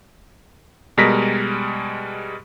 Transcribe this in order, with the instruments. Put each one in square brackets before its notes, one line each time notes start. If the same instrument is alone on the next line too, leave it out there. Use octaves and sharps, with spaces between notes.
[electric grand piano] B2 G3 G#3 A#4 A#6 B6